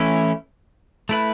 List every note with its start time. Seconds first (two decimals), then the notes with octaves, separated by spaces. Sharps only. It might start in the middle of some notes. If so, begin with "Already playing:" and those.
Already playing: E3 A3 C#4 E4
1.09 A3 E4 B4